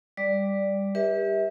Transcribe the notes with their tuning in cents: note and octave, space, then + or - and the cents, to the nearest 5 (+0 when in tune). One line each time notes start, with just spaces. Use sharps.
G3 +10 D5 +0 D6 +0
G4 +20 B4 -35 E5 -25